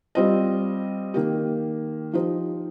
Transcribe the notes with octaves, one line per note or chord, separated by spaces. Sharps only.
G3 C4 F4 D#5
D#3 A#3 G4
F3 D#4 G4 C5